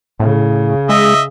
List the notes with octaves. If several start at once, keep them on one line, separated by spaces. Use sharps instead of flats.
A2 C#3
G#3 D#5 E5